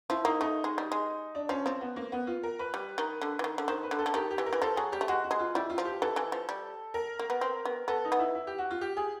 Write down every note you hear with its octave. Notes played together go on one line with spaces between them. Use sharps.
F3 E4
A#3 D#4
A3 D#4
G#3
G3
G#3
D4
F3 C#4
F3 C4
B3
A#3
B3
F4
A#4
B4
G3
D#3
D3
E3
D#3
D3
D#3 C5
B4
D3
A4
D3
D#3 G4
G4
E3
A#4
E3
F3 A4
F#3 G#4
G3 G4
A3
G#3 F#4
F#4
G#3
F4
G3 E4
F4
F3
G4
E3 A4
E3
F3
G3
A#4
A#3
B3
C4
B3
B3 A4
D#4
B3
E4
E4
G4
F#4
F4
G4
G#4